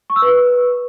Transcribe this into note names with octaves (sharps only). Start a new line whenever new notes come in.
C#6
E6
B4